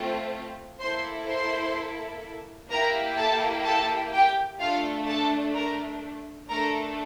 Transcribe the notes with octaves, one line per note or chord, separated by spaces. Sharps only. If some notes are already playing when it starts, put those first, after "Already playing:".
Already playing: A3 C4 F4
A#3 E4 A4 C5 C6
C5 C6
A#3 E4 G4 A#4 A#5
A4 A5
A4 A5
G4 G5
A3 D4 F4 A4 F5
A4 A5
A#4 A#5
A3 D4 A4 A#4 A#5